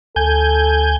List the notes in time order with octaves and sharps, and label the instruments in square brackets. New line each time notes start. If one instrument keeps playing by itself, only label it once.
[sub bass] D2 [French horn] A4 [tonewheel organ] G#5 G6